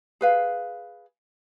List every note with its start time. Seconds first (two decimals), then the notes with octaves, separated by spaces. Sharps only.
0.21 G#4 B4 F5